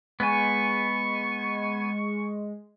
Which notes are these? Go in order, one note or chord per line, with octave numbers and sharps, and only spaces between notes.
G#3 B3 G#5 C#6